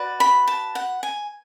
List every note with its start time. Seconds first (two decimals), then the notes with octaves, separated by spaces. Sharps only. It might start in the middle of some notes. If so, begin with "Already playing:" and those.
Already playing: F#4 B4 D5
0.20 B5
0.48 A5
0.75 F#5
1.03 G#5